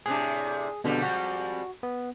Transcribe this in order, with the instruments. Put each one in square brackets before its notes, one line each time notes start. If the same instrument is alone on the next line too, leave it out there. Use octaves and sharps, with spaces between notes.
[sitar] A2 C3 D4 [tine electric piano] G#4
[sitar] F2 G3 G#3 [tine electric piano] B2 D3
[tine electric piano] F#4
B3